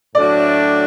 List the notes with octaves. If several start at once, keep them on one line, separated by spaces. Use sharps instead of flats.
A2 F#3 A3 D4 F#4 D5